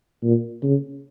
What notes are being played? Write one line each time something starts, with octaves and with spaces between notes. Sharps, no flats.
A#2
C#3